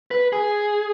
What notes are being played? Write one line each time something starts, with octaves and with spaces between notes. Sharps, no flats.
B4
G#4